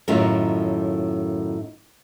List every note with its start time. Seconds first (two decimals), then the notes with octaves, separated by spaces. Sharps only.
0.08 F#2 A2 D#3 C#4 F4 A#4